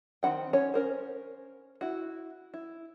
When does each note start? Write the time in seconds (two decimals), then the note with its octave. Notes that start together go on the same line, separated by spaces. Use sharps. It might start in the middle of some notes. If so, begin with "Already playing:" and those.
0.23 D#3 C4 D#4 F#5 G5
0.53 C#4 C#5
0.74 C#4 A#4 C5
1.81 E4 F#4
2.54 E4